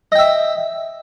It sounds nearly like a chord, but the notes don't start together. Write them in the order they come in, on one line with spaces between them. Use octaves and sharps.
D#5 G5 E5